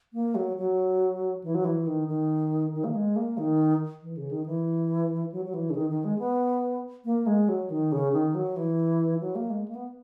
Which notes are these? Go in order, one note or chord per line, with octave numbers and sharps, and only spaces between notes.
A#3
F#3
F#3
E3
F#3
E3
D#3
D#3
D#3
A#3
G#3
A#3
D#3
E3
C#3
D#3
E3
F#3
F#3
E3
C#3
D#3
D#3
G#3
B3
A#3
G#3
F#3
D#3
C#3
D#3
F#3
E3
F#3
A#3
G#3
A#3
B3